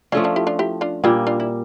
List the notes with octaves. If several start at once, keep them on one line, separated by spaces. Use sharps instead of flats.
F3 A3 C#4 D4 F4
D4 F4
E4 G4
D4 F4
E4 G4
D4 F4
A#2 G3 A#3 D4 F4
D4 F4
E4